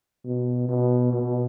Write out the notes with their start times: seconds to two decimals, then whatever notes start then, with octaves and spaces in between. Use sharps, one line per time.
0.25 B2
0.69 B2
1.13 B2